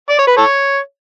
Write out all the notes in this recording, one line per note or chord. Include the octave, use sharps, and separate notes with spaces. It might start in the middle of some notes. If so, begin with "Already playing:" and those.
D5
C#5
B4
A4 C#5